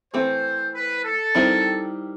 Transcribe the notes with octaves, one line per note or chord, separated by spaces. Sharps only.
E3 A3 C4 C5
B4
A4
D#3 G3 C4 E4 G4